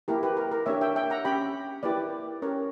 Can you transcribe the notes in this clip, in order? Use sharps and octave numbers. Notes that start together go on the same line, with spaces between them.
A#3 E4 G4 A#4
G4 B4
A#4
A#4
A#3 D4 G4 C#5 E5
E5 G5
E5 G5
F#5 A#5
C#4 G4 G5 B5
A#3 E4 G4 B4 D5
C#4 G4 A#4 C#5